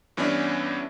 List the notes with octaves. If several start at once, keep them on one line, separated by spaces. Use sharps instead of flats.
G2 E3 B3 C#4 D4 E4